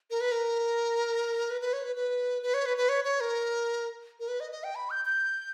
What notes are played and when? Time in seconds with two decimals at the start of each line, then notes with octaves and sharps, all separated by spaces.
0.11 A#4
0.21 B4
0.32 A#4
1.50 B4
1.61 B4
1.73 C#5
1.84 B4
1.96 B4
2.42 B4
2.54 C#5
2.66 B4
2.77 B4
2.89 C#5
3.04 C#5
3.20 A#4
4.20 A#4
4.28 B4
4.40 D#5
4.52 D#5
4.64 G5
4.75 B5
4.90 G6
5.05 G6